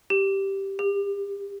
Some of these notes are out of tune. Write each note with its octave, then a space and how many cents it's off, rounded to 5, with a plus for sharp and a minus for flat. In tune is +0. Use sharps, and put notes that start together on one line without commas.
G4 -5
G4 +35